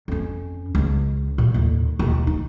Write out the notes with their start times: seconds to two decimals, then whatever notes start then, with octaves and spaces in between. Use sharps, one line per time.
0.08 F2 C#4
0.75 C#2
1.38 A#2
1.54 D#2 A2
1.99 D#2 B2
2.27 D#4